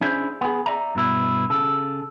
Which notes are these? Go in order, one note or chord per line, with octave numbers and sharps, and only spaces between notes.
C#4 D4 E4 G#4 C5
B3 G#4
D5 E5 A#5
G2 B2 E4
C#3 A4